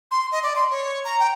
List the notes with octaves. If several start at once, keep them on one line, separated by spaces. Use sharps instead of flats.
C6
D#5
D5
C6
C#5
A#5
G5